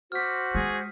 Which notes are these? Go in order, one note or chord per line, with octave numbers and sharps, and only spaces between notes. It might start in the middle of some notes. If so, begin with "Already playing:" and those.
F#4 C5 D6 F6 B6
G#3 G#4